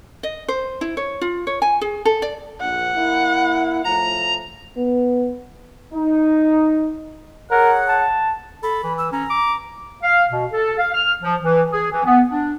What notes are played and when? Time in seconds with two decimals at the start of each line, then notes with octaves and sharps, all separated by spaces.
0.23 D#5
0.48 C5
0.81 E4
0.97 C#5
1.21 F4
1.47 C#5
1.62 G#5
1.81 G#4
2.05 A4
2.22 D5
2.61 A#1 F#5
2.95 A#3 E4
3.84 A2 F3 A3 A#5
4.77 B3
5.94 D#4
7.51 G#4 A#4 C#5 F#5
7.88 A5
8.63 A4 B5
8.84 E3
8.98 E6
9.12 C#4 A#5
9.30 D6
10.03 F5
10.30 B2
10.51 A4
10.78 F5
10.93 F6
11.23 F3
11.41 E3
11.71 G#4
11.90 E3
12.05 B3
12.28 D4